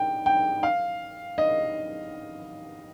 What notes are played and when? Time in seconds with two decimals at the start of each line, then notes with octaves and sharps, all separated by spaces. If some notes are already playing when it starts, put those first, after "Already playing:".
Already playing: G5
0.26 G5
0.63 F5
1.38 D#5